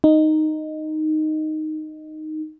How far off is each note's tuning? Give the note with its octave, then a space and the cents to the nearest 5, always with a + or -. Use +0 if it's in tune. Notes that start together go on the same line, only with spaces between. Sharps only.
D#4 -5